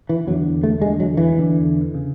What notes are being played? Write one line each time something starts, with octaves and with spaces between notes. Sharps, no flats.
E3
E2 D3 F#3
A3
E2 D3 G#3
F#3
E3
E2 D3
C#3